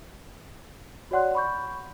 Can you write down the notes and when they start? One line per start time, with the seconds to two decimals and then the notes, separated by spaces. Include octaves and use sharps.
1.11 F#4 C#5 D5 F#5 C6 F#6
1.35 B5 C#6 G6